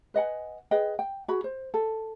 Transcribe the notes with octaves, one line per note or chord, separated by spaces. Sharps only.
B4 D#5 F#5 G#5
G#4 B4 D#5 G5
G5
F#4 G#4 B5
C5
A4